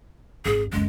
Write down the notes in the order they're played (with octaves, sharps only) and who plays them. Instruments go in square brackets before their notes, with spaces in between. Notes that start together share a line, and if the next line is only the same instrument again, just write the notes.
[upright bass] G#1 [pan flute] G#4
[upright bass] F#1 D2 [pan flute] G#3